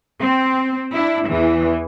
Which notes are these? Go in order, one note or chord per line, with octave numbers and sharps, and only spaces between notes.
C4
D4 E4
E2 E3